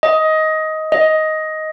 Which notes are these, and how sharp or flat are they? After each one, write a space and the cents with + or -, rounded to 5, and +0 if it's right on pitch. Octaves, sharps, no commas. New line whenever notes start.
D#5 +15
D#5 +10